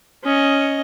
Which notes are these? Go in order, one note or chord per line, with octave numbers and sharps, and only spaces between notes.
C#4 D#5